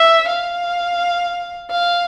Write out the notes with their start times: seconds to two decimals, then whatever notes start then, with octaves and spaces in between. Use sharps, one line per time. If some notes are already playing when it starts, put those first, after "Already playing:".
Already playing: E5
0.29 F5
1.71 F5